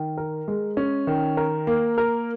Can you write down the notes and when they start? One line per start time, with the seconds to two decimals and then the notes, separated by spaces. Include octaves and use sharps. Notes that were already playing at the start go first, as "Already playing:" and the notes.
Already playing: D#3
0.18 A#4
0.48 G#3
0.77 C#4
1.07 D#3
1.37 A#4
1.67 A#3
1.98 A#4